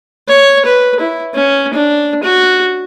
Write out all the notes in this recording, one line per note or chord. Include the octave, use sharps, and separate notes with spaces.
C#5
B4
E4
C#4
D4
F#4